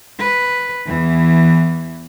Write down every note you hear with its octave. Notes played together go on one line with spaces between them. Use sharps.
B4
E2 E3